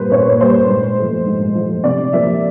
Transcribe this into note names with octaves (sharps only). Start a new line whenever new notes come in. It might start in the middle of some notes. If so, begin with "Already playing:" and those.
Already playing: A#2 G3 A#3 B4 C5
A#2 C#5
G3 A#3 C5
G#2
F3 A3
G#2
F3 A3
C3 D5
F3 A#3 E5